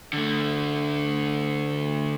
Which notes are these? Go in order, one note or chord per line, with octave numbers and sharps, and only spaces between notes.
D3 A3